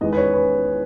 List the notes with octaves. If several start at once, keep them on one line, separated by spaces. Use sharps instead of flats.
E2 D#3 G#3 B3 D#5
B4
C#5
B4